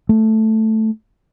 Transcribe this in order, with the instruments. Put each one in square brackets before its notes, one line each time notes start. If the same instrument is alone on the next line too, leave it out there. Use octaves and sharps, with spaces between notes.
[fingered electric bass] A3